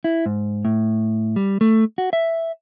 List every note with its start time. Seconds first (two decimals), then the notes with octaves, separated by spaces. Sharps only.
0.04 E4
0.26 G#2
0.65 A2
1.36 G3
1.61 A3
1.98 F#4
2.13 E5